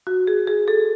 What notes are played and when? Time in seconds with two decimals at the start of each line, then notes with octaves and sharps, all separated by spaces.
0.07 F#4
0.27 G#4
0.47 G#4
0.68 A4